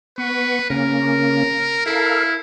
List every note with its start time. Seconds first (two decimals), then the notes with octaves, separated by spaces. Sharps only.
0.18 B3 B4 C#6
0.70 C#3 A#3 C#4 A#4
1.86 E4 A4 A#4 F5